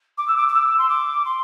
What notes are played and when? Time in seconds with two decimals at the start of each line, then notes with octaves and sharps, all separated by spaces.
0.17 D6
0.27 E6
0.36 D6
0.48 D6
0.53 E6
0.78 C6
0.89 D6
1.25 C6